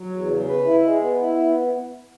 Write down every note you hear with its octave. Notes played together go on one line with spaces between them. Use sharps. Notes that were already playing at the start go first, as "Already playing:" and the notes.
Already playing: F#3
E2
C#3
B4
E4
G#3
B3
E4
B3